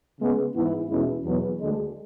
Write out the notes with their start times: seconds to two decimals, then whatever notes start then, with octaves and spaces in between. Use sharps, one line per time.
0.19 C#3 G#3 B3
0.53 G#2 E3 B3 E4
0.88 E2 B2 G#3 C#4 E4
1.24 E2 B2 F#3 B3
1.59 D2 D3 G#3